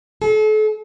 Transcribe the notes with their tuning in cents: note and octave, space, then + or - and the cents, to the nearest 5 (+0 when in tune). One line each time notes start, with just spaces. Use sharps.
A4 -40